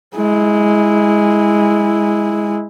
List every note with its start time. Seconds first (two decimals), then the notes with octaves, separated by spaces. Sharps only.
0.16 G#3 E4